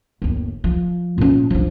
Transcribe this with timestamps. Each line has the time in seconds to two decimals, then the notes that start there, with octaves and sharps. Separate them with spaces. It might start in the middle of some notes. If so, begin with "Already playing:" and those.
0.22 G1 D#2
0.64 F3
1.18 A#2 C#4
1.50 F3 D4